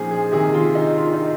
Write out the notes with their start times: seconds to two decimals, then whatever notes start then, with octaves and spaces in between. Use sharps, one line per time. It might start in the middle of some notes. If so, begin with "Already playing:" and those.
Already playing: A#2 F3 C#4 D#4 F4 G#4 C5
0.11 G#4
0.31 C3 D#3 G#4
0.54 F4
0.75 D#4
0.98 F4
1.13 D#4